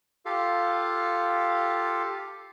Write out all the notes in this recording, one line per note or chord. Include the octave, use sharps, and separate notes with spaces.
F4 G4 A4 F5